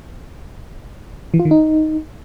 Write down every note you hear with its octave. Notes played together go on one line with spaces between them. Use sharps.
E3
F4
D#3
D#4